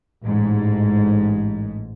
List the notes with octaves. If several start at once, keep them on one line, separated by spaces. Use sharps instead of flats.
A1 G#2